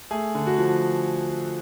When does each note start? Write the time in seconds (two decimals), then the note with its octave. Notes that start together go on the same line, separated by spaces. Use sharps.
0.11 A3 G#4
0.35 D3
0.47 F#4
0.58 F3